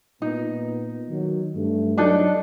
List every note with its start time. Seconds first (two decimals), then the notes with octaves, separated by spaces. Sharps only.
0.22 A#2 B3 D#4
1.09 D#3 F#3
1.56 G2 A3
1.97 F#3 D4 D#4 A4